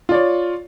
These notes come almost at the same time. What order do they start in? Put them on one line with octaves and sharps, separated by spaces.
F4 D5 C#5